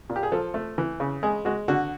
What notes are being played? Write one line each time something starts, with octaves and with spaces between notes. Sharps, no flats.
A#2
G4
G#4
F3 A4
A3
E3
C#3
G#3 G#4
G#3 F#4
D3 F#4